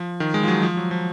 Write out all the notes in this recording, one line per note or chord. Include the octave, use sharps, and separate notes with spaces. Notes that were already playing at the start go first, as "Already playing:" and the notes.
Already playing: F3
D#3
G#3
F3
F#3
F3
F#3
F3